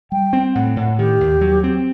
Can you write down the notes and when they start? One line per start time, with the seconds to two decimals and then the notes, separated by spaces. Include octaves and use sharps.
0.12 G3 G5
0.33 C4
0.54 A2 F#5
0.77 A2
0.99 D#3 G4
1.20 D#2
1.41 F#3
1.64 C4